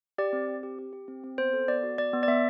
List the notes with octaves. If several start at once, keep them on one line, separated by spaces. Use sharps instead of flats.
G4 D5
C4
C4
G4
G4
G4
C4
C4
B3 C5
A4
B3 D5
F#4
B3 D5
B3
D5
B3 E5